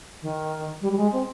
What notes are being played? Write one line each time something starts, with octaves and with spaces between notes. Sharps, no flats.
D#3
G3
G3
G#3
C4